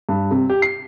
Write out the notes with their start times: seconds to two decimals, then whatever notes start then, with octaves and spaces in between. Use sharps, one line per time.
0.09 G2
0.31 C3
0.50 G4
0.62 C7